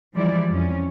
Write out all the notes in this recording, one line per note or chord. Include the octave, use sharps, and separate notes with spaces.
E3 F3 G3 G#3 E4 D5
F2 C#4